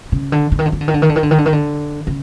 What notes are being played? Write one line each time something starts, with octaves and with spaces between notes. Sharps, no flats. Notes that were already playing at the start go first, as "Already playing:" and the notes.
C#3
D3
D3
D#3
D3
D#3
D3
D#3
D3
D#3
D3
D#3
D3
D#3
D3
D#3
D3
C#3